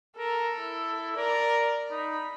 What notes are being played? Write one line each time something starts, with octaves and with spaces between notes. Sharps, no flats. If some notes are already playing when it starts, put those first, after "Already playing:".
A4 A#4
E4
A#4 D5
D#4 B5